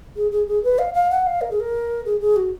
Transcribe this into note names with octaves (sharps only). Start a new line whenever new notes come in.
G#4
G#4
G#4
B4
F5
F5
F#5
F5
A#4
G#4
A#4
G#4
G#4
F#4